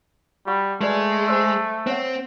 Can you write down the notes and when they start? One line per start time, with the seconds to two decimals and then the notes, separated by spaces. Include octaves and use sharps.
0.47 G3 F#4 F#5 C#6
0.81 G#3 A3 F#4 B4 D5
1.28 C5 D#5 E6
1.87 C4 C5 C#5 F#5